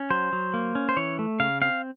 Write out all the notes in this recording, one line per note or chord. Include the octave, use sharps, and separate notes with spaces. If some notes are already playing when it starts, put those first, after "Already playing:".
Already playing: C#4
F#3 C5
F#3
A#3
C#4
C5
E3 C#5
A3
C#3 F5
C4 F5